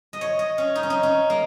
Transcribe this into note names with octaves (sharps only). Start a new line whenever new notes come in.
D#5
C#5
D#5
C#4
D#4
C#4
D#4
C#4
A#3